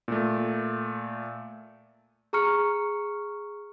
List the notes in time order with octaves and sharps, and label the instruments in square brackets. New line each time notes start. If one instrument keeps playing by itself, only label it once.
[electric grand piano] A#2 A3
[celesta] G#4 A#5 C#6 F6 C#7